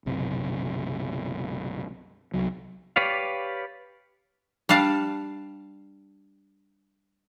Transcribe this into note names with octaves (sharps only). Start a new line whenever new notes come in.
F#1 B1 C3
C2 F#3
G4 B4 C#5 D5 F5
G3 D4 F5 A5